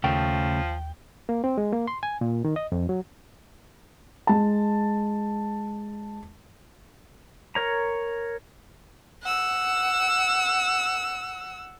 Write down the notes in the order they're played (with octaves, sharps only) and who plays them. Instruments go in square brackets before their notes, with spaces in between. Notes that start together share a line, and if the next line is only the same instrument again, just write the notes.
[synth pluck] D#2 [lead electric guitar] C#3 A3 [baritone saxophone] F3 [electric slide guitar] G5
[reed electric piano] A#3
C4
G#3
A#3
C6
G#5
A#2
D#3
D#5
F2
F#3
[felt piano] G#3 A5
[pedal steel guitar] A#4 C#5 A#5
[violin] F#5 E6